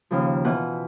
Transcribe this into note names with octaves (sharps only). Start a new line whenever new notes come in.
D#2 C#3 F3
B2 E3 F4 F#5